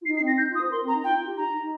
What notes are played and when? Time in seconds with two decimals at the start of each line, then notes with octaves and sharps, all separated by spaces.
0.01 F4
0.06 D#4 C7
0.16 C7
0.22 C4
0.27 A#6
0.38 D#4 G6
0.50 F4
0.55 D#6
0.61 C5
0.71 A#4 C6
0.83 C4
0.88 A#5
0.94 D#4
1.04 F4 G5
1.16 F4
1.26 G4
1.37 D#4 A#5
1.48 D#4
1.59 D#4